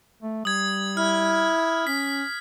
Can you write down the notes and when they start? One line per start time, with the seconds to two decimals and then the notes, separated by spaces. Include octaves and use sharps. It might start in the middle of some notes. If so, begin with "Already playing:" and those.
0.23 A3
0.45 G3 D#6 G#6
0.97 E4 F6
1.87 C#4 B6